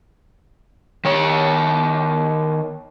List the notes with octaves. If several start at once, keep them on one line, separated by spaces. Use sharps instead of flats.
D#3 C#5